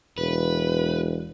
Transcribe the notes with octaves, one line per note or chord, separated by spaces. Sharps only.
E1 B4